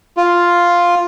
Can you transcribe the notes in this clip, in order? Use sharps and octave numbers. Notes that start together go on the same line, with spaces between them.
F4